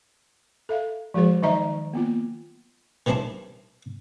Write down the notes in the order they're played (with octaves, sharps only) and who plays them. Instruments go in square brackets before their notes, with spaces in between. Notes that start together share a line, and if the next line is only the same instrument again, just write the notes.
[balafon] A4 E5 F5
F3 G#3 F#4 G#4 C5
D#3 F#3 D#4 D#5 E5 A#5
A#3 B3 F4
[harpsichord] D#3 E3 G3 C4 D4 E4